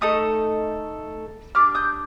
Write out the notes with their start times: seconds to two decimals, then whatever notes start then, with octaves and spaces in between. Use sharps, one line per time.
0.01 A3 D#4 A4 D#6
1.55 D4 G4 D6 F6
1.75 D#6 G6